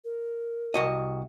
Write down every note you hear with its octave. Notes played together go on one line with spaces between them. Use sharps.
A#4
C2 F#4 D#5